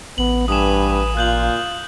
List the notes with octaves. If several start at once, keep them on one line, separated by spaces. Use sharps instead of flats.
A1 B3 F#7
G2 B4 G#5 D#6 E7
A#2 F4 F#6 G6 F#7